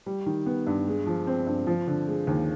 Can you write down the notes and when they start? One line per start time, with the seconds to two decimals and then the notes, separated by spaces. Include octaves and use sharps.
0.06 G3
0.26 D#3
0.46 B3
0.67 G2
0.88 G#3
1.07 F3
1.27 C4
1.47 G2
1.67 F3
1.88 D3
2.08 G#3
2.27 D#2